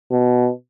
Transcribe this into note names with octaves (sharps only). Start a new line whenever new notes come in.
B2